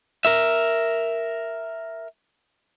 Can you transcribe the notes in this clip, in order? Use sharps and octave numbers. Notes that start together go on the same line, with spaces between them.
A#4 E5